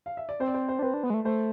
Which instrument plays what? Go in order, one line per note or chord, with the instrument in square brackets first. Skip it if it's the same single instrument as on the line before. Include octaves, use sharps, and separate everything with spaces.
[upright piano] F5
E5
D5
[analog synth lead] C4 [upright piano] C5
[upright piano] D5
C5
C5
[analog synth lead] D4
[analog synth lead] C4 [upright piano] B4
[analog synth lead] D4
B3
G#3
A3
[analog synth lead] A3 [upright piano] C5